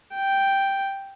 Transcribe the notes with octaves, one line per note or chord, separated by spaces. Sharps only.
G5